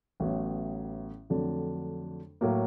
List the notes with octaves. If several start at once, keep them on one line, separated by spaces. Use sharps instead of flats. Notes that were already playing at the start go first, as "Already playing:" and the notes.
A1 A2 F#3 B3
F2 D3 F#3 A3 D4
A2 F#3 A#3